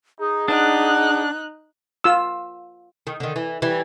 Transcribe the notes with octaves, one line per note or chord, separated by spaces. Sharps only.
D#4 G#4
D4 D#4 F#5 F#6
F4 E6
D#3
D3 D#3
E3
E3 G3